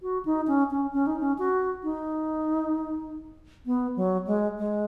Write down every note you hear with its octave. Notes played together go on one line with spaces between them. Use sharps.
F#4
D#4
C#4
C#4
C#4
D#4
C#4
F#4
D#4
B3
F#3
G#3
G#3